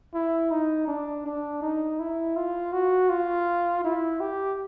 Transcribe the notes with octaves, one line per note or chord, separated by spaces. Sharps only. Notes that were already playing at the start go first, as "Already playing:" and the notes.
E4
D#4
D4
D4
D#4
E4
F4
F#4
F4
E4
G4